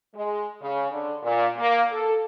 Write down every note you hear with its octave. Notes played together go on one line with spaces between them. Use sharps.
G#3
C#3
D3
A#2
A#3
A4